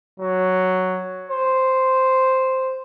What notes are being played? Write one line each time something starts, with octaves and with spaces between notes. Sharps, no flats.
F#3
C5